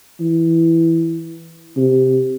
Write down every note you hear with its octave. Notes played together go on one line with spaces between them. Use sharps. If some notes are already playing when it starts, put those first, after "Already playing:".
E3
C3